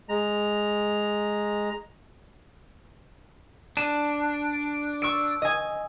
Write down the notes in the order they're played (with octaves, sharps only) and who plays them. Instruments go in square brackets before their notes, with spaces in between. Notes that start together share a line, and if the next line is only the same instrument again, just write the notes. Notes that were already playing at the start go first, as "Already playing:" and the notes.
[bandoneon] G#3 A#5
[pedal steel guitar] D4 [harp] D#7 E7
[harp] C#6 E6 D7
D#5 G#5